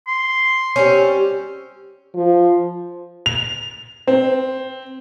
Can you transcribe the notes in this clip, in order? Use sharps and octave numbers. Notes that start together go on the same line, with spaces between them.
C6
G3 C4 C#4
F3
F7
C4